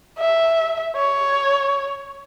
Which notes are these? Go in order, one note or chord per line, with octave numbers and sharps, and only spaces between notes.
E5
C#5